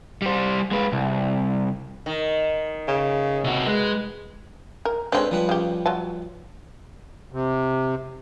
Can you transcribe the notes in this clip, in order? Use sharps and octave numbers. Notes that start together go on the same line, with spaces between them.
G3 C5
G#3 B4
C2
D#3
C#3
C3 F#4
G#3 B4
A#4
G#3 C4 D4 A4 B4 C#5
F3 G3 B4
C#3 G4
F#3 F4 A5
C3